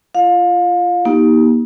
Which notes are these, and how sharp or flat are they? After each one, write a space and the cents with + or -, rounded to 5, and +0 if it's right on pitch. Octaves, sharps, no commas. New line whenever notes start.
F4 -20 F5 +30
A#3 +40 D#4 +20 G4 +0